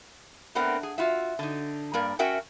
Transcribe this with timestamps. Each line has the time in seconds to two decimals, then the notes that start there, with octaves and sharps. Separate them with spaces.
0.55 A3 B3 C4 D4 A#4 F#5
0.83 G#4
0.98 F4 F#4 E5
1.39 D3 D#4
1.94 G2 A#3 A#4 D5
2.19 C#4 F#4 A#4 E5 F#5 G5